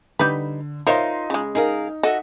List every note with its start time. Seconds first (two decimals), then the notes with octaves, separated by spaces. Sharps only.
0.19 D3 G3 D#4 B4
0.87 D#4 F4 A#4 C5 C#5 D#5 E5 C6
1.30 C#3 G#3
1.55 D#4 G#4 A#4 F5
2.03 F#4 A4 D#5 E5